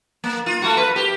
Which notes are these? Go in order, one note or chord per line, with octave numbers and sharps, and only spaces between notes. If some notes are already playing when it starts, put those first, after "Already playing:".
A#3
F4
A3 A#3 F#4
B4
G4